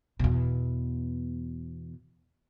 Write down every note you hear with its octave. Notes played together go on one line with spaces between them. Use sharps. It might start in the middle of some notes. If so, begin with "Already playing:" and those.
E2 B2